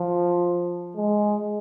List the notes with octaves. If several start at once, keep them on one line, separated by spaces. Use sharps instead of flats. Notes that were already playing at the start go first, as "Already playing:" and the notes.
Already playing: F3
G#3